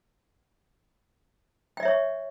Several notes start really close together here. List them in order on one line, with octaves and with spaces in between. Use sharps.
G5 D5 E5 C#5 C#6